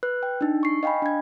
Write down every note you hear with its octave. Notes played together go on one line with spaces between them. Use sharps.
B4 F#6
G5
D4 D#4
C#6 C7
D#5 F5 G5 G#5 B5
D4 G#6